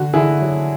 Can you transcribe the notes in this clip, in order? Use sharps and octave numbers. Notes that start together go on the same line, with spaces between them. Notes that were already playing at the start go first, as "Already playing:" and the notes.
Already playing: D3 F#4
D3 E4 G#4
F#3